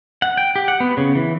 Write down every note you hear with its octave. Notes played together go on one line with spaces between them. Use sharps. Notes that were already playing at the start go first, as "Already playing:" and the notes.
F#5
G5
G4
F#5
B3
C#3
E3